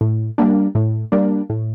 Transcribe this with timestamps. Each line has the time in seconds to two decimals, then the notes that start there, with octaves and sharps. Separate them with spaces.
0.01 A2
0.38 G3 A#3 D4
0.75 A2
1.12 G3 A#3 D4
1.50 A2